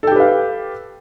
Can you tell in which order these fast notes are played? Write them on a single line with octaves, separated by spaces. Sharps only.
A4 G5 G4 B4 F5